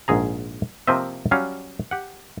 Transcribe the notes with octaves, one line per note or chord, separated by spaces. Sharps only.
A#1 G#2 G#4 A#5
C3 F3 A#3 C4 D#5 E5
F#3 G3 C#4 F5
G4 F#5